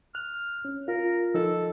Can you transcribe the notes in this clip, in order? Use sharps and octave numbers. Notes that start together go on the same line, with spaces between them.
F6 F#6
C#4
F4 A#4
F3 D#4 A4 E6